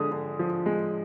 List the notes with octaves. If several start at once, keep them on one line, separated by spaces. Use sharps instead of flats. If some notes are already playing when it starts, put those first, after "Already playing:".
Already playing: D3 F3 G#3 D#6
D3
F3
G#3